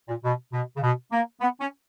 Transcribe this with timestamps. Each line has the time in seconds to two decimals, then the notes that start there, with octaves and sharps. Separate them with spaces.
0.08 A#2
0.23 B2
0.52 B2
0.77 C#3
0.82 B2
1.11 A#3
1.41 B3
1.60 C#4